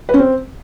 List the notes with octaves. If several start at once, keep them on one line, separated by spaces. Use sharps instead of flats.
B4
C#4
C4